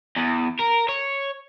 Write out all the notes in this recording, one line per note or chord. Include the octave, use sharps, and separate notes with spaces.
E2
A#4
C#5